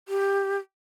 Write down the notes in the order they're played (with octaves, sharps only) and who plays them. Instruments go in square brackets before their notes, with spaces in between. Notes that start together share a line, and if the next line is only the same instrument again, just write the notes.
[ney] G4